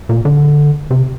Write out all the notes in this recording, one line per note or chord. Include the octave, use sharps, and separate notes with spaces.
A#2
D3
C3